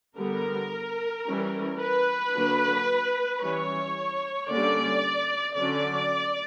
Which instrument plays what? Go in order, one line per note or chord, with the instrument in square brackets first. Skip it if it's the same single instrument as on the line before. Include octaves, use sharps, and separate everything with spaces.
[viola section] D3 G3 B3 A#4
E3 G3 C#4
B4
D3 F#3 A#3 D4
E3 G3 C#4 C#5
D3 G3 A#3 C#4 D5
D3 F#3 C#4 D5